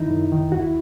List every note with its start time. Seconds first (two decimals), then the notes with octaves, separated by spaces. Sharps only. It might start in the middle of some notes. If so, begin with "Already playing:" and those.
Already playing: F#2 D#3 D#4 E4
0.11 F#2
0.32 D#3
0.52 D#2 F#4
0.60 E4